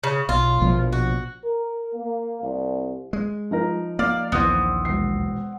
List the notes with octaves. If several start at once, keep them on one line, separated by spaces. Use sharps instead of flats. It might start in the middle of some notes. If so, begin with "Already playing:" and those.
C#3
B1 F4
A#1 B2 F3
F#4
A#4
A#3
C2
G#3
F3 D#4 A#4
A#3 D5 F5
A#1 D#2 E3 B3 C4
E1 C7